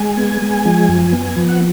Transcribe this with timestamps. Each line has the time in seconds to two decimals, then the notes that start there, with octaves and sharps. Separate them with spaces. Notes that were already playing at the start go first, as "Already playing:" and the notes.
Already playing: G#3 G#5
0.17 B3
0.42 G#3
0.66 F3
0.88 F#2
1.12 B3
1.36 F3
1.49 F#5